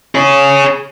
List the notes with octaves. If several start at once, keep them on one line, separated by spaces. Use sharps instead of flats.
G#4 C#5